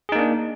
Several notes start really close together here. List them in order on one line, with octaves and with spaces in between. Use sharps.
G#4 D#4 A#3 D4